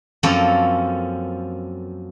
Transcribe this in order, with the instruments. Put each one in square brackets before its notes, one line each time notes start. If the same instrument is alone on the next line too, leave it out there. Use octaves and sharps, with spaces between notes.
[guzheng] F#2 F3 A#3 C4 C#4 A4